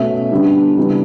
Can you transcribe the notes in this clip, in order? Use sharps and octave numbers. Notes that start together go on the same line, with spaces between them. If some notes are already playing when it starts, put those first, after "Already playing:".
Already playing: B2 A3 C#4 E5
D3 G3 B3 D4
C#3 E3 G3 B3 D4